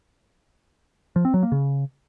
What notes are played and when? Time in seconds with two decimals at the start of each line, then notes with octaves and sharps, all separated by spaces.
1.16 F3
1.25 C4
1.34 F#3
1.43 A#3
1.52 C#3